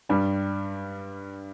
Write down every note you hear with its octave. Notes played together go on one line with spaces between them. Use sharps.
G2 G3